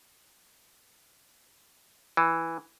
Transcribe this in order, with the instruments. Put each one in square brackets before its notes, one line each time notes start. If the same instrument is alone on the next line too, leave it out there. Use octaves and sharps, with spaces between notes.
[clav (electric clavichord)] E3